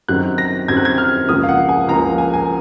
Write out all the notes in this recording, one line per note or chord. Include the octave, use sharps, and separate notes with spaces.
F#2 D#3 F#3 C4 F#6
A#6
F#2 D#3 F#3 C4 G#6
F#6
G#6
F6
C#2 C#3 F3 A#3 D#6
F5
F#5
G#5
C#2 C#3 F3 A#3 A#5
G#5
G#5